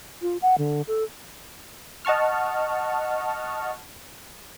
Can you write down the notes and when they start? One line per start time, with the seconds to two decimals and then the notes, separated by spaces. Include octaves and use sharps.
0.22 F4
0.42 F#5
0.58 D3
0.88 A4
2.05 D#5 F#5 A5 C#6 F6